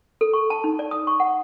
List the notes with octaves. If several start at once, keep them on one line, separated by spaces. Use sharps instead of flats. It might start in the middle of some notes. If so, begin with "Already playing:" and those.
A4
C#6
A5
D#4
D5
D#6
C#6
F#5